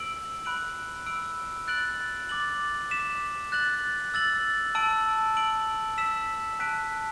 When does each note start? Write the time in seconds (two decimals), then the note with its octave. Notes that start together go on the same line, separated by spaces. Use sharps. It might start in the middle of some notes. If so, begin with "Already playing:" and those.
Already playing: E6 D7 F#7
0.45 B5 F#6 D7 F#7
1.06 B5 E6 D7
1.68 F#6 A6 D7 F#7
2.29 D6 A6 F#7
2.91 D6 B6 E7
3.52 F#6 A6 F#7
4.14 E6 A6 F#7
4.75 A5 E6 D7 F#7
5.36 E6 D7 F#7
5.98 E6 B6 E7
6.59 A5 F#6 B6 D7